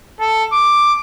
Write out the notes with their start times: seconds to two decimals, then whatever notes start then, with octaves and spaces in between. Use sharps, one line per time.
0.20 A4
0.53 D6